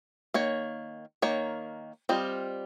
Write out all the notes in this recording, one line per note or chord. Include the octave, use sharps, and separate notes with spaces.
D#3 A#3 C#5
D#3 A#3 C#5
G3 C4 F4 C5 D#5